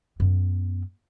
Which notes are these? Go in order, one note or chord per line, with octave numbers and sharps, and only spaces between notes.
F#2 B3